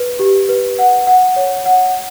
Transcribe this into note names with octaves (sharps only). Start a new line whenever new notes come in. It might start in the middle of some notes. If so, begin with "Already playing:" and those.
Already playing: B4
G4
B4
F#5
F#5
C#5
F#5